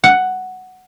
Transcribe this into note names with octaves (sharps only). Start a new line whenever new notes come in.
F#5